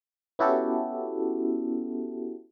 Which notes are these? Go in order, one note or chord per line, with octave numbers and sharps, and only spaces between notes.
B3 C#4 E4 F#4 G4 A4